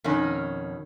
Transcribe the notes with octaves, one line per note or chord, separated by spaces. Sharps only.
F2 B2 D#3 C#4